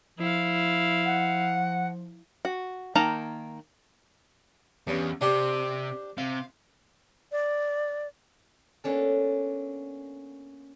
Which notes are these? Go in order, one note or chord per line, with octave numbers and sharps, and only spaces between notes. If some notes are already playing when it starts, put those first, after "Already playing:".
F3 E4 F5
F#5
F#4
D#3 A#3 D#4 A5 A#5
E2 G2 C#4
C3 D4 G4 C5
C3 F5
D5
A#3 B3 C#4 D4 A4